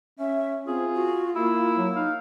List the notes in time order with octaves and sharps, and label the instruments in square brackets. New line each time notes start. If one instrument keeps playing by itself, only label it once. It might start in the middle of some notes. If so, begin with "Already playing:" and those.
[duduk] C#4 [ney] E5
[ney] C4 [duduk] F4 [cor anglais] G#4
[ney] F#4
[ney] A#3 [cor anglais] E4
[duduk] F#3
[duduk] D#4 [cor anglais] F5